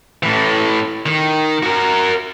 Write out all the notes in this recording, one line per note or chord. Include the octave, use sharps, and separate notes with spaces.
A2 E3
D#3
F#4 A#4